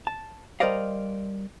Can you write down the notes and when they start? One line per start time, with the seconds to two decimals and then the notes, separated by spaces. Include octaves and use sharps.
0.07 A5
0.60 G3 A#4 C5 D5 D#5 F5